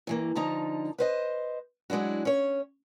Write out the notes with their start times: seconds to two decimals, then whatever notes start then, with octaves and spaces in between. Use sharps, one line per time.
0.07 G2 E3 A#3
0.35 D2 D3 F3 D#4 A#5
0.98 B4 C5 D#5
1.90 F#3 G#3 D4 E4 F#4
2.25 C#4 C#5